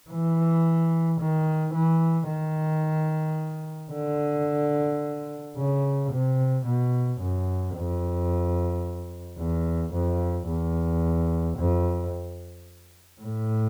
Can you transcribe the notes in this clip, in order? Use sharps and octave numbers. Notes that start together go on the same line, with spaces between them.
E3
D#3
E3
D#3
D3
C#3
C3
B2
F#2
F2
E2
F2
E2
F2
A2